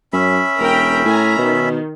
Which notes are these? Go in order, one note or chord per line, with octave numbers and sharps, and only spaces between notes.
F#2 C#4 E5 B5
E1 A#4 G5
A2 G#5 A#5
B2 D#3